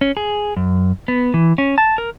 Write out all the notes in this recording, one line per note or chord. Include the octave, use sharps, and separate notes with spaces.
C#4
G#4
F#2
B3
E3
C#4
A5
A#4